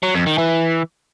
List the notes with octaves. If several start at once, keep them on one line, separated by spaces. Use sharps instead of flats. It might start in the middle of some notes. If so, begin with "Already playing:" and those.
F#3
F2
D#3
E3